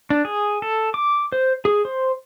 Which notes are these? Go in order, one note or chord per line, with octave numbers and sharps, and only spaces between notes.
D4
G#4
A4
D6
C5
G#4
C5